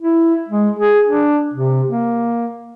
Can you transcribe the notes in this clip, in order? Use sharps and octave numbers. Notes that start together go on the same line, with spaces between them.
E4
G#3
G#4
D4
C3
A#3